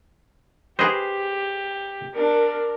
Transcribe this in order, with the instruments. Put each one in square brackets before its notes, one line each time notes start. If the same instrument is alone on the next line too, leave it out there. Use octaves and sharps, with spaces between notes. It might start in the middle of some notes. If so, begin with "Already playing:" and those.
[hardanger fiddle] G4 [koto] G#4 B4 D#5 [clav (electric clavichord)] C5
[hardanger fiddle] D4 [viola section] A#4